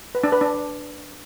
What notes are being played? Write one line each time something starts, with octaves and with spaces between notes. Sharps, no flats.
B4
D4
B4
D4